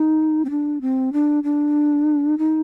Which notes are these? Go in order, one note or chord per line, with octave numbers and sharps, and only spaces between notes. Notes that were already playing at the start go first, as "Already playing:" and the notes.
Already playing: D#4
C4
D4
C4
D4
D4
D#4